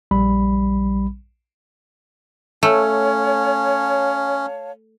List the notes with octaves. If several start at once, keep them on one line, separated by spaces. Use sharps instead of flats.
A#1 G3 B5
A3 C#4 C#5 F5 A5